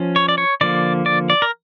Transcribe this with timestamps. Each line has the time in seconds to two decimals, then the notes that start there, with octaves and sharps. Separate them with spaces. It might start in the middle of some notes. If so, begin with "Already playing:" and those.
Already playing: F3 C#4
0.16 C#5
0.28 D5
0.38 C#5
0.61 D3 F3 A#3 D5
1.06 D5
1.30 D5
1.42 A#4